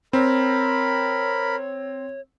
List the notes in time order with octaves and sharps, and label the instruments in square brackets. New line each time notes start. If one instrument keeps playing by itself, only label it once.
[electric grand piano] C4 [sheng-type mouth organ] A#4 B5 [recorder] C#5